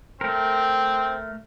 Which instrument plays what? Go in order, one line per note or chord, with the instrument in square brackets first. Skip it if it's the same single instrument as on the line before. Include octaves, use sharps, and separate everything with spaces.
[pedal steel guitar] A3 A#4 [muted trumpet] C4